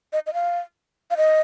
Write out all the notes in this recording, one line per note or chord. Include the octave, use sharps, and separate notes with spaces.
D#5
D#5
F5
F5
D#5